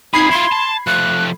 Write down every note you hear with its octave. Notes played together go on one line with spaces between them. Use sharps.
F2 D#4 G#4 B5 G#6 C7
E4 F4 C6
A5
F3 A3 F#6